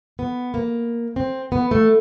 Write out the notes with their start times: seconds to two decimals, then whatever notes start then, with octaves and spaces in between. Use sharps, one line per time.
0.19 B3
0.54 A#3
1.16 C4
1.52 B3
1.71 A3